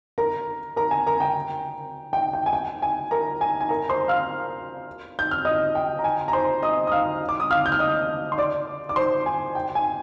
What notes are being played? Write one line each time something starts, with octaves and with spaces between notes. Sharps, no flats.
A#4 A#5
A#4 A#5
G#5
A#4 A#5
G5
G5
G5
G#5
G5
G#5
A#4 A#5
G#5
G#5
A#4 A#5
C5 C6
F5 F6
G6
F6
D#5 D#6
G5
A#5
G#5
A#5
C5 C6
D#5 D#6
D#6
F5 F6
D6
D#6
F5 F6
G6
F6
D#5 D#6
C6
D5 D6
D6
C5 C6
G#5
G5
G#5